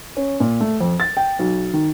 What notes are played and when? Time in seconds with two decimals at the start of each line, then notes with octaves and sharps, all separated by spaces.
0.17 C#4
0.40 A#2
0.61 A3
0.80 F2
1.00 A6
1.17 G5
1.39 B1
1.73 D#3